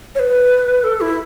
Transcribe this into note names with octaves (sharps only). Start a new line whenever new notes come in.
C#5
B4
A4
E4